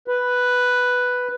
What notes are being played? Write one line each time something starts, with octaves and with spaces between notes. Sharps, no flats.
B4